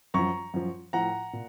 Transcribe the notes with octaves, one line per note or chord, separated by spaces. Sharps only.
F#2 F3 A#5 C#6
F#2 F3
A2 F3 F#5 A#5
A#2